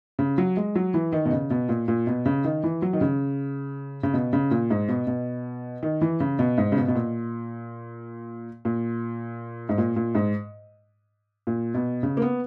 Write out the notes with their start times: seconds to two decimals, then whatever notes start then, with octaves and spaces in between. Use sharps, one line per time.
0.19 C#3
0.38 F#3
0.57 G#3
0.75 F#3
0.94 E3
1.13 D#3
1.25 B2
1.32 C#3
1.50 B2
1.69 A#2
1.88 A#2
2.07 B2
2.26 C#3
2.44 D#3
2.63 E3
2.82 F#3
2.93 D#3
3.01 C#3
4.03 C#3
4.14 B2
4.33 C#3
4.51 A#2
4.70 G#2
4.89 B2
5.07 B2
5.83 D#3
6.01 E3
6.20 C#3
6.39 B2
6.58 G#2
6.72 C#3
6.77 B2
6.88 B2
6.95 A#2
8.65 A#2
9.69 G#2
9.78 A#2
9.96 A#2
10.15 G#2
11.47 A#2
11.74 B2
12.03 C#3
12.17 A#3
12.22 B3